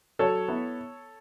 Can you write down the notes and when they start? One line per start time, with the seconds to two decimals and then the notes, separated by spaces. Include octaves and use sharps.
0.19 F#3 A4 C#5
0.48 B3 E4